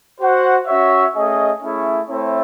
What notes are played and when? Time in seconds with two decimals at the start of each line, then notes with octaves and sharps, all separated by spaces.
0.19 F#4 C5 F#5
0.67 C#4 F#4 C#5 E5
1.15 A3 C#4 G#4 D#5
1.62 A3 C#4 E4 G#4 C#5
2.09 A3 C4 E4 A4 C#5